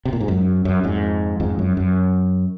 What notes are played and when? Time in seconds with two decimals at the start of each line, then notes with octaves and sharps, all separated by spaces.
0.05 C3
0.13 A#2
0.20 G#2
0.28 F#2
0.65 F#2
0.84 F2 G#2
1.40 F2 G#2
1.59 F#2
1.77 F#2